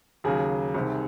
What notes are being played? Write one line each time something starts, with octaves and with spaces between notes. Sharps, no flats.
D#2 C#3 F#3 G#4
C2 C3 D#3